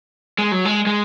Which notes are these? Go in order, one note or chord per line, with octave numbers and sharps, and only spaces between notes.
G#3
F#3
G#3
G#3